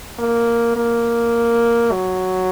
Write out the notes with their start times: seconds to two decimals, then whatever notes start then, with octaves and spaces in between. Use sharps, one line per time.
0.19 A#3
0.76 A#3
1.92 F#3